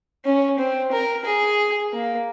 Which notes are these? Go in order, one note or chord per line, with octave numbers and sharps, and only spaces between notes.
C#4
C4
A#4
G#4
A#3